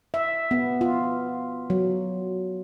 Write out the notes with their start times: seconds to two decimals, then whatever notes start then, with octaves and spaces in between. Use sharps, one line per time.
0.14 E5
0.51 B3
0.81 F4
1.70 F#3